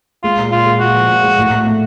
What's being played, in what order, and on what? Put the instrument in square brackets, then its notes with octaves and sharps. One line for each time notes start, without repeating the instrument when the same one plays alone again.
[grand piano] G#3 [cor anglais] F4
[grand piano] A#2
[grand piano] A#2 [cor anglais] F4
[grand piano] G#3
[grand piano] A#2 [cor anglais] F#4
[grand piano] F3
A#2
G#3
A2
A2
A3